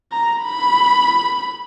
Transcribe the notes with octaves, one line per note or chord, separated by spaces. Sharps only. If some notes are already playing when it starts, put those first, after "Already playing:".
A#5
B5